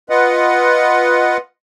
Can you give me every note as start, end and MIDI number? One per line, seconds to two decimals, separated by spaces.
0.09 1.37 65
0.09 1.37 71
0.09 1.37 75
0.09 1.37 78